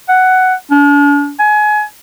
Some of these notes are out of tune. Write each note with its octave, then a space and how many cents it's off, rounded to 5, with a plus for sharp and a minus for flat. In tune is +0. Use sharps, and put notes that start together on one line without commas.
F#5 +10
D4 -40
G#5 +25